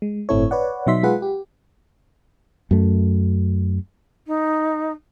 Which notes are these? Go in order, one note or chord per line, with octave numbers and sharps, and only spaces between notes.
G#3
G1 A2 C4 E4 A4 C#5
B4 C#5 D5 F#5
B2 F#3 D#4 E5 C6 B6
G#3 F4 G#4 B4 F#5
G4
F#2 A3
D#4